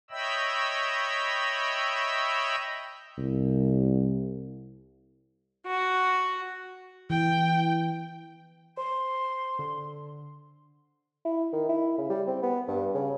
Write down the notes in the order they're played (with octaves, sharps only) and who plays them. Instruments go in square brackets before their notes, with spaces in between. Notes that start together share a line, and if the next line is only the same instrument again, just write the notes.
[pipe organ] C#5 D#5 E5 G5 B5 E6
[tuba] C2
[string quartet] F#4
[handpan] E3 [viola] G5
[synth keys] C5 [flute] C6
[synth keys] D3
[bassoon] E4
D#3
E4
C#3
G3
C4
B3
G2
C#3